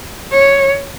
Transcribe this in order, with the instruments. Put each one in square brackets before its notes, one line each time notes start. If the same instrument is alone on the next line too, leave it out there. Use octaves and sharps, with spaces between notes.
[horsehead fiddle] C#5